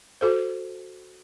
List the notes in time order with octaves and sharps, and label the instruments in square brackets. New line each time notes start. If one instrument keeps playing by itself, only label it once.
[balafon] F#4 A4 C5